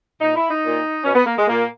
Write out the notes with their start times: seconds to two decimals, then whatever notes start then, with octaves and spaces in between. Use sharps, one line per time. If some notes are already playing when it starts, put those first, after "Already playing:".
0.21 A#2 D#4
0.36 E4
0.50 D#4
0.64 A#2
1.05 B2 C#4
1.15 B3
1.26 A#3
1.37 G#3
1.47 A#2 A#3